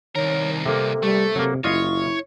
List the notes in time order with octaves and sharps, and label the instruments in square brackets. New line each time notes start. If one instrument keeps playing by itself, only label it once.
[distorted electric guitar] C2 A#4 [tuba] D#3 [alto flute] C#5
[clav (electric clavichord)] C3 A#3 [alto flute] A4
[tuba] G3 [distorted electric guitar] A3
[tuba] C3 [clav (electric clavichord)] F#3 A#3
[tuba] F#1 [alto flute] E4 [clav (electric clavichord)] F4 D#5 F5 [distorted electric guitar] C#5